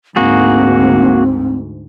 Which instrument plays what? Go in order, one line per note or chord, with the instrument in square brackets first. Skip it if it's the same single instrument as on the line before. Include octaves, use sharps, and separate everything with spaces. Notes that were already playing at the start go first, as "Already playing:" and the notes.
[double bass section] D2 G#2 [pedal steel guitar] A#3 F#4 G#4 [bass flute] C4